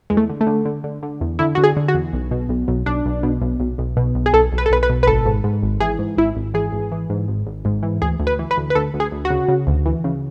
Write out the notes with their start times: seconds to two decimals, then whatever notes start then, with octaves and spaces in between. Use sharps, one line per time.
0.10 E2 G#3
0.17 A3
0.29 D3
0.41 A3
0.47 D3
0.65 D3
0.84 D3
1.03 D3
1.21 E2
1.39 D3 E4
1.55 D3 F#4
1.64 G#4
1.77 D3
1.88 F#4
1.94 E2
2.13 B1
2.31 B2
2.49 B1
2.68 B1
2.86 B1 D4
3.05 B1
3.23 B2
3.42 B1
3.60 B1
3.78 B1
3.97 B2
4.15 B1
4.26 G#4
4.33 B1 A4
4.52 B1
4.58 B4
4.66 A4
4.70 B1 B4
4.83 B4
4.89 B2
5.03 B4
5.07 G#1 A4
5.26 G#2
5.44 G#2
5.63 G#1
5.80 E3 G#4
5.99 G#2
6.17 G#1 E4
6.36 G#1
6.54 E3 G#4
6.73 G#1
6.92 E3
7.10 G#2
7.28 G#1
7.46 G#1
7.65 G#2
7.83 E3
8.02 D2 G#4
8.19 D2
8.27 B4
8.39 E3
8.51 B4
8.57 D2
8.70 B4
8.75 D2 A4
8.94 D2
9.00 G#4
9.12 D2
9.25 F#4
9.30 C#3
9.48 C#3
9.67 D2
9.86 E3
10.04 C#3